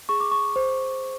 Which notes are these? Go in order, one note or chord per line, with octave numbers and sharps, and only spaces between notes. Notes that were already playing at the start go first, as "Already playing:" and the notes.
G#4 C#6
D6
C#6
C5